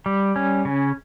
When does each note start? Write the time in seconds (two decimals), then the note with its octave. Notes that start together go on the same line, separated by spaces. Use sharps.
0.06 G3
0.36 C#4
0.65 C#3